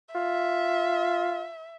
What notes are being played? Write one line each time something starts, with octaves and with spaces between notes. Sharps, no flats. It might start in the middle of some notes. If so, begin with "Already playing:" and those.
F4 E5